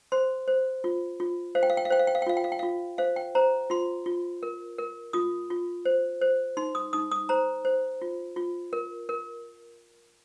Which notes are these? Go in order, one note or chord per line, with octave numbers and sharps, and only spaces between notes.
C5 C6
C5
F4
F4
C5 F5
G5
F5
G5
F5
C5 G5
F5
G5
F5
G5
F4 F5
G5
F5
G5
F4 F5
C5 F5
G5
C5 A#5
F4 C6
F4
A#4
A#4
F4 D#6
F4
C5
C5
D#4 C6
D#6
D#4 D#6
D#6
C5 A#5
C5
F4
F4
A#4
A#4